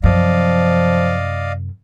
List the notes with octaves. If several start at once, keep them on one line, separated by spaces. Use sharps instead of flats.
F#2 C3 F3 D5 D#5 F5